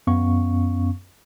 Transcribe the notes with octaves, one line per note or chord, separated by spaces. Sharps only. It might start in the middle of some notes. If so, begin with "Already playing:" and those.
F#2 B3 C#4 F5 C#6